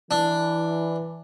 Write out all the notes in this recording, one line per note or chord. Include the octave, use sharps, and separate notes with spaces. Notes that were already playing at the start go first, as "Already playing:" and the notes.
E3 D4